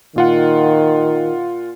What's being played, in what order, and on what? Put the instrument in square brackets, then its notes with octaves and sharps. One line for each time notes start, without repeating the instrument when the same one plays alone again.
[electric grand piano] A#2 F4 F#5 [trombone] D#3